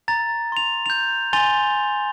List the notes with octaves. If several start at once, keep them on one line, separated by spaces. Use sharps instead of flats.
A#5 A6
C6 F7
G6 F7
G#5 C6 A6 F7 G7